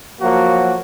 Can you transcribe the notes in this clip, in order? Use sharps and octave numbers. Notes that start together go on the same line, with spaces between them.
F3 F#3 A#3 F#4